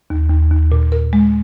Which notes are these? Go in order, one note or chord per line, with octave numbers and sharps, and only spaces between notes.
D#2
D#2
D#2
A#2
A#4
G#3